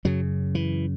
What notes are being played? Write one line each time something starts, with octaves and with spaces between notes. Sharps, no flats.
F#2 C#3 F#3
E3